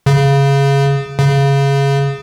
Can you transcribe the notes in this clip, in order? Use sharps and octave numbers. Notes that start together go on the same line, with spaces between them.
C#3
C#3